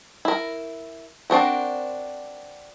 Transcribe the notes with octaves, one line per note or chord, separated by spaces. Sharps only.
E4 A#4
C4 D4 F#4 A#4